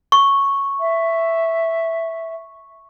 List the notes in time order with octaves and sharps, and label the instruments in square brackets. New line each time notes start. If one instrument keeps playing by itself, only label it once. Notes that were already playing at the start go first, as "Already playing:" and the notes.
[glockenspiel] C#6
[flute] E5